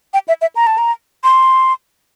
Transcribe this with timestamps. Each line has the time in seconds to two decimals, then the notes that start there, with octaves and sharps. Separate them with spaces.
0.14 G5
0.28 E5
0.41 E5
0.56 A#5
0.67 A5
0.78 A#5
1.24 C6